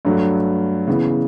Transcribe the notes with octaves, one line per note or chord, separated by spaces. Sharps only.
G2 F#3 A3
C#3 E3 B3